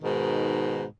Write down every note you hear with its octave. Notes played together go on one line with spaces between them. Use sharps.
G#2 B2 D#3